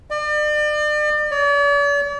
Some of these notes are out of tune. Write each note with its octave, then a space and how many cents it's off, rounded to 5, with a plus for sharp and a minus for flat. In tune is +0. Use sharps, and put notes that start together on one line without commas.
D5 +40
D5 -45